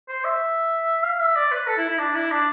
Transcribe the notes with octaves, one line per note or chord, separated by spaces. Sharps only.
C5
E5
F5
E5
D5
B4
A4
E4
E4
D4
E4
D4